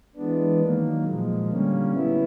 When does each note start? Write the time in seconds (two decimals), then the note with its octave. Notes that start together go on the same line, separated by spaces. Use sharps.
0.16 E3 G#3 B3 D4
0.60 D#3 F#3 A#3
1.05 A#2 F3 G#3
1.48 D3 G3 A#3 C#4
1.94 F#3 B3 E4